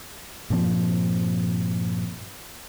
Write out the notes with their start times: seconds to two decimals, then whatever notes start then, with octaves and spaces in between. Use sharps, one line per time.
0.50 G2 A#2 F3 C4